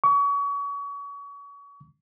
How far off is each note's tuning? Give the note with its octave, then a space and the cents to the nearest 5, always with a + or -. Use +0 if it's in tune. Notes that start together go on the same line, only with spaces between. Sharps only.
C#6 +35